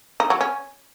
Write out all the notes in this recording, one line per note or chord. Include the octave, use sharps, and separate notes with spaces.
D#4
F#3
C#4